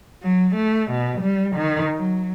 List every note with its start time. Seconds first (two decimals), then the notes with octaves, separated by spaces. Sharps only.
0.22 F#3
0.56 A3
0.91 B2
1.22 G3
1.56 D#3
1.97 F#3